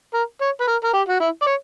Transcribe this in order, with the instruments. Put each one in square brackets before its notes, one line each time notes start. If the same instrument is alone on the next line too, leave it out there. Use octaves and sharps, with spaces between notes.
[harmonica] A#4
C#5
B4
A#4
A#4
G4
F#4
E4
D5
C#5